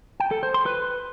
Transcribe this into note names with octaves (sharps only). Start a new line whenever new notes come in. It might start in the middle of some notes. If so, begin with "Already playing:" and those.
G5
A4
C5
C6
B4